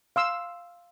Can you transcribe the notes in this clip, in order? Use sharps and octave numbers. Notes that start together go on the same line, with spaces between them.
F5 C6 E6